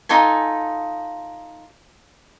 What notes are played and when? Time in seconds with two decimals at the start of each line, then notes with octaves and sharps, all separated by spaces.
0.09 D#4 F4 A4 G#5